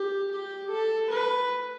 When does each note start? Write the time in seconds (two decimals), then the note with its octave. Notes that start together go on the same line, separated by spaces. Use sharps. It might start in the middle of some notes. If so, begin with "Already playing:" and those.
Already playing: G4
0.32 G4
0.71 A4
1.11 B4